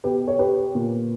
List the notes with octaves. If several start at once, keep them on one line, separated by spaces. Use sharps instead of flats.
B2 G4 B4
C#5
G4 B4
A#2